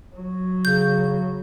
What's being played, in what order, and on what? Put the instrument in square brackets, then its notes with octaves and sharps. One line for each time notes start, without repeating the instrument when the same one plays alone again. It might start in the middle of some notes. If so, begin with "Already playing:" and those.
[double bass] F#3
[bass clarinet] C#3 [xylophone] G6